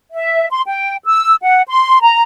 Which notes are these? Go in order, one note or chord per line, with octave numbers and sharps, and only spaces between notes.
E5
C6
G5
E6
F#5
C6
A#5